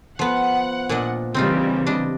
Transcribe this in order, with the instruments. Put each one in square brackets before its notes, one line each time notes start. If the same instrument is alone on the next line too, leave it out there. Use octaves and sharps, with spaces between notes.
[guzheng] F3 B3 [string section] F#5
[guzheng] A#2 D4 D#5
[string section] C#3 E3 G3 [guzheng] C4 D#4 F4
[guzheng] D4 D#5